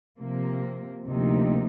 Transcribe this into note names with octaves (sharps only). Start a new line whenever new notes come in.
C3 F3 A#3
D2 C3 F3 A#3 D#4